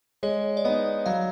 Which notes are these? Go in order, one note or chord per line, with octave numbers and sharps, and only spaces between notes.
G#3 C#5
D5
B3 D#4 D#5
F#3 F5